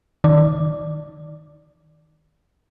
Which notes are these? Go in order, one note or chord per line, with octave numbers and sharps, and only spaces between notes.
D#3 D5